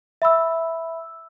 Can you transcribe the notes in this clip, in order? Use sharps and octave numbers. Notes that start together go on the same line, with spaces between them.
E5 B5 E6